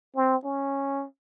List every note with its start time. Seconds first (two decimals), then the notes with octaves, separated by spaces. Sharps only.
0.16 C4
0.44 C#4